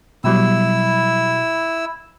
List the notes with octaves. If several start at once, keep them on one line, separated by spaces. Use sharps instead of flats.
B2 F#3 G3 E4 E6